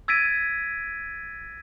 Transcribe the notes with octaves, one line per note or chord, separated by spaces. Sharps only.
E6 G#6 A6 B6 D7 D#7